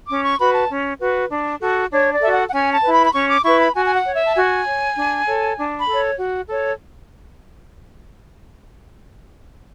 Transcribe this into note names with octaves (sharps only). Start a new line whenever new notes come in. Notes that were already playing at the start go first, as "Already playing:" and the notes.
C#4 D6
C#6
F#4 B4 B5
A5
C#4
F#4 B4
D4
F#4 A4
D4 C#5
D5
F#4 A4 E5
F#5
F#5
C#4 G#5
A5
E4 B4
B5
B5
C#4 C#6
D6
E4 B4 C#6
B5
F#4 G#5
G#5
F#5
C#5
E5
A5
F#4 G#5
C#5
D4
A4 C#5
D4
B5
A4 C#5
F#4
A4 C#5